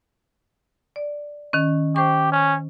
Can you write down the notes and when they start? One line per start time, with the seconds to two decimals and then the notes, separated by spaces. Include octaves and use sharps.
0.96 D5
1.53 D#3 C#4
1.96 G4 C5 C#6
2.32 C#4